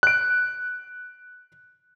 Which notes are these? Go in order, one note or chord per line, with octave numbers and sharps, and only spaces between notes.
F#6 D7